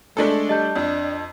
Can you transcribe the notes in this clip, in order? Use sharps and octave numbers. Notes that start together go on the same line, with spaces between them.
G#3 A3 D4 A4
G3 D#5 A5 G6
F2 D4